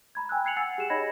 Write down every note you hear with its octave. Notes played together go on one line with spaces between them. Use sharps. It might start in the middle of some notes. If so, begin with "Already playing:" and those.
A#5 B5 G#6
G5 G#5 E6 F#6
F#6 G#6 C7 C#7 F7 F#7
F#5 G#5 E6 A6 C7 C#7
G4 G#4 E7
D#4 C#5 D#5 B5 G#6 A#6